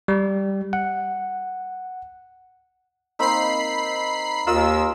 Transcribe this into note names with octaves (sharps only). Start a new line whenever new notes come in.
G3
F#5
A#3 C4 D#4 B5 C7
D#2 F4 A#4 D#5 E6